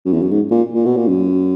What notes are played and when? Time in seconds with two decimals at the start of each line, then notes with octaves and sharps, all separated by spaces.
0.06 F#2
0.13 E2
0.22 F#2
0.31 G#2
0.51 A#2
0.74 A#2
0.85 B2
0.97 A#2
1.08 F#2